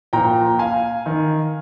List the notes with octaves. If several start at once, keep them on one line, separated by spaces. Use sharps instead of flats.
A#2 F3 G5 A#5
F5 G#5
D#3